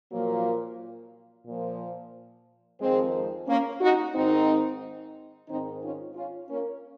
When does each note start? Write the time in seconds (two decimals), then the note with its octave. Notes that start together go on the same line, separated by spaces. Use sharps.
0.12 A#2 F3 F#3 A#3
1.46 A#2 F3
2.80 F2 D#3 G#3 C4
3.47 A#3 C#4
3.81 D#4 F#4
4.14 G#2 D#3 C4 D#4
5.48 G#2 D#3 C4 D#4
5.82 C#4 F4
6.15 C#4 F4
6.49 A#3 C#4